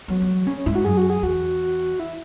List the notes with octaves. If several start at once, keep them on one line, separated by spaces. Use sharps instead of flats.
F#3 B3
B3
E3
C#3 C#4
C#4
G#2 E4
F#4
F#2 G#4
F#4
G#4
E2 F#4
E4